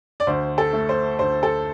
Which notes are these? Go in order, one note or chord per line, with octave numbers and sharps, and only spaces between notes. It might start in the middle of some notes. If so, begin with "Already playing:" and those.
D5
D2 C5
A4
A3
C5
D2 C5
A4